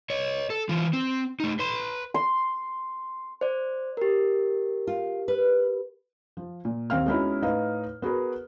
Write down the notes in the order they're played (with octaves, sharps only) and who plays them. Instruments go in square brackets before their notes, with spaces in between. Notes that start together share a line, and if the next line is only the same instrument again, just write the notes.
[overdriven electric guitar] C#5 D#5
A4
E3 F4
C4
A3 D#4
B4 C6
[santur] C6
[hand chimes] C5 D5
G4 A#4
[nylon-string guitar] F4
B4
[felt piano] F3
A#2
D#2 C4 F5 F6
G#3 B3 C#4 D#4 E4 F#4
A2 D#4 B4 F5
B3 F#4 G#4 A#4 B4